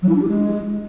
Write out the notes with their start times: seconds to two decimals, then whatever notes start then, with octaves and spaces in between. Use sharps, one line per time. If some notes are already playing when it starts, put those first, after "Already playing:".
0.02 F#3
0.09 E4
0.15 D4
0.22 G4
0.28 G#3